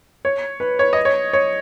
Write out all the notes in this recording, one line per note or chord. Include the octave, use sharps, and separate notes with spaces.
C#5
B4
C#5
D#5
C#5
C#5